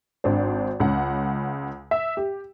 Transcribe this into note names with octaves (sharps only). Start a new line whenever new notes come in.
G#1 D4 C5
C#2 C#3 F#5
E5
G4